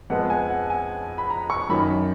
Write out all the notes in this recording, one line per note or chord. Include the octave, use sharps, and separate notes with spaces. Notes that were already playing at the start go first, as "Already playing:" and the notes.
F2 F3 G#3 B3 F#5
G#5
F#5
G#5
B5
A#5
C#6
F#2 D#3 A#3 B5